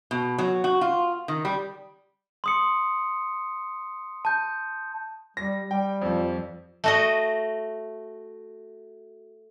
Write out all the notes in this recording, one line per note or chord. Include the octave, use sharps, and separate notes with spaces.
B2
F#3
F#4
F4
D#3
G3
C6 D#6 C#7
A5 G6
G3 A#6
G3 G5
F2 F3
A3 F#4 D#5